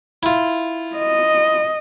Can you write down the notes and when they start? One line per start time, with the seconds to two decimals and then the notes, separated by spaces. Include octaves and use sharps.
0.23 E4 F4
0.96 D#5